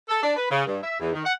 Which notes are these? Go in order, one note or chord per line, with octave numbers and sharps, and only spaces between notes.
A4
D4
B4
C#3
G2
E5
E2
D#3
F#5